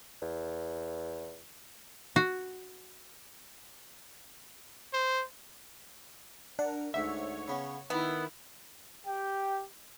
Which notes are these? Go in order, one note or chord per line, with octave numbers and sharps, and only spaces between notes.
E2
F#4
C5
D4 A#4 F#5
D2 G#2 C#5 E5
C#3 B3 C#4
D#3 B3 E4 A#4
G4 G5